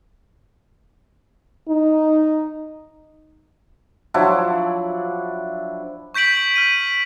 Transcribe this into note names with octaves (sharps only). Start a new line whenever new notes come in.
D#4
F3 F#3 D4 E4
C#6 G6 B6 D7 F#7
F6 G6 D#7